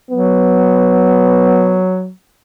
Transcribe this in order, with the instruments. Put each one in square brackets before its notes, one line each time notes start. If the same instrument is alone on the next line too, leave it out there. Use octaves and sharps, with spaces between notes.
[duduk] F#3 [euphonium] B3